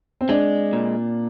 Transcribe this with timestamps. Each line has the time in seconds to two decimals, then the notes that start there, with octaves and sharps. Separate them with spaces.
0.21 C4
0.29 G#3 D4
0.73 A#2